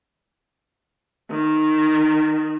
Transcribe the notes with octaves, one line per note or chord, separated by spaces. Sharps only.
D#3